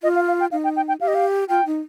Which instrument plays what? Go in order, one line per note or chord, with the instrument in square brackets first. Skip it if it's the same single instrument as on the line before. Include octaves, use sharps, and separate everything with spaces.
[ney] F4 [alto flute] D#5
[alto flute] F5
F5
G5
[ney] D#4 [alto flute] F5
[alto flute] G5
G5
G5
[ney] G4 [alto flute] F5
[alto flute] D#5
F5
[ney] F4 [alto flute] G5
[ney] D#4